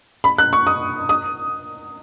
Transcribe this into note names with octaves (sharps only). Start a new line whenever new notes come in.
B5
F#6
C#6
D#6
D#6